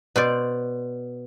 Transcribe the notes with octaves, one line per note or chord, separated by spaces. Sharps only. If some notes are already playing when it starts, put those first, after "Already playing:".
B2 C5 D5